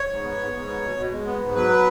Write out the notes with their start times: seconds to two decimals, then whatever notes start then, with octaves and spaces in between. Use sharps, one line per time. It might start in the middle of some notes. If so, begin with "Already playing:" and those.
Already playing: C#5
0.09 G#2
0.23 B3
0.38 G#2
0.53 G#2
0.67 B3
0.82 B2
0.97 B2
1.11 G#3
1.25 B3
1.41 G#2
1.54 F#3 B4
1.69 B3